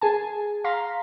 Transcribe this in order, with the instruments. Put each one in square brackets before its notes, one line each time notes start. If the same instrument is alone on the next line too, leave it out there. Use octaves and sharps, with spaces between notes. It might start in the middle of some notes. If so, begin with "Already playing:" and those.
[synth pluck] G#4 G#5 A5
F5 A#5 C6 B6